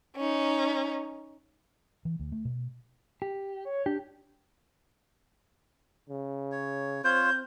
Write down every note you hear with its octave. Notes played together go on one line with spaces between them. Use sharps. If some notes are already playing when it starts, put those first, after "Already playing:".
C#4 D#4
E3
D2
A3
B2
G4
C#5
D4 G4
C#3
C#5
C4 F4 C5 C#5 G6